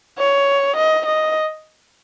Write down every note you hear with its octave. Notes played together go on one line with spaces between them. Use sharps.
C#5
D#5
D#5